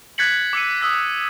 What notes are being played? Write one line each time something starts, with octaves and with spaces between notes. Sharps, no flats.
F#6 G#6 A6 B6 C#7 F#7
D6 E6 C#7 D#7
D#6 E6 B6